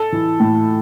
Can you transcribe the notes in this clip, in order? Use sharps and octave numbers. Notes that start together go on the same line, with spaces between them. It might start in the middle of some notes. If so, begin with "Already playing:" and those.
Already playing: A4
E3
A2